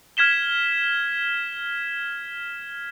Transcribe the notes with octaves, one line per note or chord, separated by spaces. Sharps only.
F6 G#6 B6 E7 G7